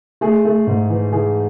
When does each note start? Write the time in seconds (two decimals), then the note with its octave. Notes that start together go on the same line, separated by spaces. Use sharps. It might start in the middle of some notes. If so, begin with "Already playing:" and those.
0.21 A3 G#4
0.45 A3
0.67 G#2
0.89 E3
1.12 E3 G#4